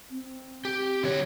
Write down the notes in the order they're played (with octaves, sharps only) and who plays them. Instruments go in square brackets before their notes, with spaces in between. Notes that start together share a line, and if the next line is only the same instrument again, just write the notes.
[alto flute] C4
[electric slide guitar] G4
D3 F#3 C#5